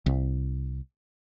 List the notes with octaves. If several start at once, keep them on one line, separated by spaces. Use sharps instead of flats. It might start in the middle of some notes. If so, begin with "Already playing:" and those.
C2